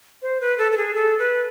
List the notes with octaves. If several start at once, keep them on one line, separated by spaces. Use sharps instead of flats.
C5
B4
A4
A4
G#4
A4
B4